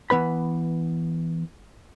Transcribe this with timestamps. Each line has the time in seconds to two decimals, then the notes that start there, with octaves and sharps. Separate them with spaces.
0.10 E3 B3 B4 B5